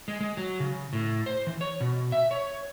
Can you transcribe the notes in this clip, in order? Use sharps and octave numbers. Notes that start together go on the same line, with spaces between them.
G#3
G#3
F#3
C#3
A2
C5
E3
C#5
B2
E5
C#5